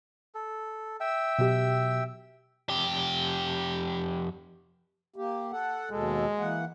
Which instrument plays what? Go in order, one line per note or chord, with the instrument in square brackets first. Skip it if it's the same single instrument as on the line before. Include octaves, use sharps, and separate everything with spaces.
[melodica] A4
E5 G5 E6
[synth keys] B2 F#3 G4
[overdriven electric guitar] F2 G4
[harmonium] A#3 G4
A4 F#5
[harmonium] D#2 B2 A4 [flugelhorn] G#3
[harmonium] E3 A#3 F#5